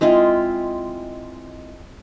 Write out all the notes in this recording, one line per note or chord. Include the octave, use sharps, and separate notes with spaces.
G#3 C4 E4 F4